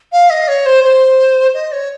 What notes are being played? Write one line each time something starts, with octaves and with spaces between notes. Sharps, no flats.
F5
D#5
C#5
C5
C5
D#5
C#5